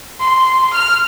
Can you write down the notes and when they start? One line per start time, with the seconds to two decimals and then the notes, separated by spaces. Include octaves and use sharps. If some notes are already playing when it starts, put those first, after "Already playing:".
0.20 C6
0.74 F6